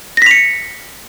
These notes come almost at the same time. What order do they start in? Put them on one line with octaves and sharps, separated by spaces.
A#6 B6 F7 C#7